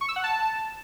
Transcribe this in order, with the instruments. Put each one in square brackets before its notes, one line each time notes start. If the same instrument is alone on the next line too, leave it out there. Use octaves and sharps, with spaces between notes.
[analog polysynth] C#6
E6
F#5
A5